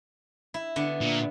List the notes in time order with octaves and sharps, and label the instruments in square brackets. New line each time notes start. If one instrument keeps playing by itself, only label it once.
[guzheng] E4
D3 B3 D4
[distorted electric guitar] A#2